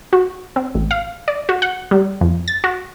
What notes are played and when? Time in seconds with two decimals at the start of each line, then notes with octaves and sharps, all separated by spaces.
0.13 F#4
0.56 C4
0.75 A1
0.91 F5
1.28 D5
1.49 F#4
1.62 F#5
1.91 G3
2.21 F2
2.48 A6
2.64 F#4